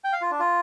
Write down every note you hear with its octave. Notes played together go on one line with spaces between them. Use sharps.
G5
F5
F4
D4
F4